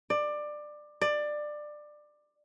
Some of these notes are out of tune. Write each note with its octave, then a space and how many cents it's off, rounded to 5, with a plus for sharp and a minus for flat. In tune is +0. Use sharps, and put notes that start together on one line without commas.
D5 +20
D5 +20